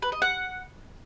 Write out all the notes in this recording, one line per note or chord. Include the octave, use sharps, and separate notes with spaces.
B4
D#5
F#5